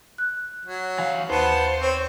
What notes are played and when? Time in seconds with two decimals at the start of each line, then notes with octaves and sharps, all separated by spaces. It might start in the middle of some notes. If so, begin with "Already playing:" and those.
0.18 F#6
0.66 F#3
0.98 E3 F5
1.30 D#2 B3 C5 A5
1.80 C4 C#5